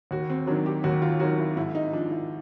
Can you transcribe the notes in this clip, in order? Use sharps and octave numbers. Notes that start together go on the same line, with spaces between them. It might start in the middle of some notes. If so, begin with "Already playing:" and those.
D#2 F#4
C4
D#3 F#3 D4
G4
D#2 F#4
F4
D#3 F#3 F#4
E4
G#2 E4
D#4
F3 D4
E4